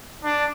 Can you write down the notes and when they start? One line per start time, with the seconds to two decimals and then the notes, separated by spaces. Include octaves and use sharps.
0.24 D4